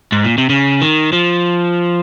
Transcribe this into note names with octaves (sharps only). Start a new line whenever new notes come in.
G#2
A#2
C3
C#3
D#3
F3